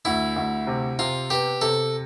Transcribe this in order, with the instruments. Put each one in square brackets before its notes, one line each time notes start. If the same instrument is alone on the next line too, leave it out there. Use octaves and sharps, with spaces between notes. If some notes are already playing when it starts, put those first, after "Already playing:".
[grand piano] D2 [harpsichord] E4
[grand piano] D2
C3
[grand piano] C3 [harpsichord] F4
[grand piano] B3 [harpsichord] G4
[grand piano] C3 [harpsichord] A4